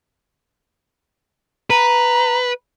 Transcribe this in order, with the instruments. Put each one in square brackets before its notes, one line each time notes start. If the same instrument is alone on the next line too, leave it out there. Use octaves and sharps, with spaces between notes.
[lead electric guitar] B4 [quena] A#5